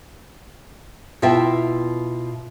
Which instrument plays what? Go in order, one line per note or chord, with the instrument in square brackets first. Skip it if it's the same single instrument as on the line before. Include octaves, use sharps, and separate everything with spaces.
[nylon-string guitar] B2 E4 F4 E5 G5 A5